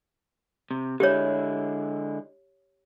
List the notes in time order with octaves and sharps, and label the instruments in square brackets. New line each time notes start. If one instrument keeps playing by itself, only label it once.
[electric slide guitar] C3
[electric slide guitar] D3 G#3 E4 [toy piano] G4 C#5